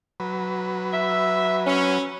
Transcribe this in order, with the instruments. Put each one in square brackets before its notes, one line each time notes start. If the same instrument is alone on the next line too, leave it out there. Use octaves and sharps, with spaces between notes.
[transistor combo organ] F#3 B4
[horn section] E5
C#4